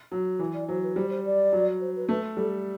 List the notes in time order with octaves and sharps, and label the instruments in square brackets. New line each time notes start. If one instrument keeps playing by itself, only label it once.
[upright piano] F#3
E3
[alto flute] D5
[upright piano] F#3 [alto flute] C5
[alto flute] B4
[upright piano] G3 [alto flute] C5
[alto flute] C5
D5
[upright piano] F#3
[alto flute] C5
B4
[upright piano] A3 [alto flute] B4
[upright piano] G3 [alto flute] A4